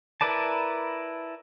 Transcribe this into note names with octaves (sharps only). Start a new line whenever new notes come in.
E4 A#4 B4 D5 A5